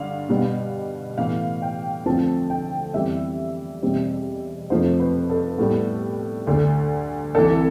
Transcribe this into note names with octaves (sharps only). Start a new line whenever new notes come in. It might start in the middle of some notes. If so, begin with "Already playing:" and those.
Already playing: G2 D3 F5
B2 G3 B3
A2 E3 B3 F5
G5
D2 D3 F3 A3 C4 A5
G5
F2 E3 G3 B3 E5
E2 B2 G3 C4
F2 C3 F3 A3 C5
B4
A4
A2 G3 B3
D2 D3 A3
C2 C3 E3 A4